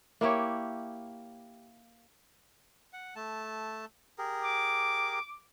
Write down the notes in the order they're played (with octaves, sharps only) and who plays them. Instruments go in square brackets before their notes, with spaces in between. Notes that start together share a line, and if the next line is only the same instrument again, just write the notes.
[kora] A#3 E4 G4 C#5
[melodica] F#5
A3 A5
G4 G#4 A#4
[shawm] D6